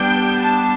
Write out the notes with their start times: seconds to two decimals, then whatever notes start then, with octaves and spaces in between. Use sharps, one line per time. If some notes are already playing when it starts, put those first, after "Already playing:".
Already playing: G3 B3 D4 G5
0.42 A5